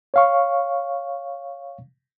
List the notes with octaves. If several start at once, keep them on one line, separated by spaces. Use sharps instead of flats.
C#5 F5 C#6